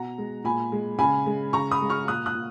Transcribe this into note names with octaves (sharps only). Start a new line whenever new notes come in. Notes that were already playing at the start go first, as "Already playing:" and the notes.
Already playing: B2 F#5 A#5
G#3
A#2 G#5 B5
G#3
C#3 G#5 B5
G#3
C#3 A#5 C#6
B5 D#6
G#3
C#6 F6
A#2 D#6 F#6
D#6 F#6
A#2